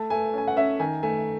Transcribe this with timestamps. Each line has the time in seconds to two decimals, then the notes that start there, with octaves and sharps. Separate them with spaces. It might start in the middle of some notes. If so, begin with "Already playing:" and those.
Already playing: A3 A5
0.10 A3 G#5
0.34 C#4 G#5
0.48 F#5
0.57 C#4 E5
0.80 D#3 G#5
1.03 A3 G#5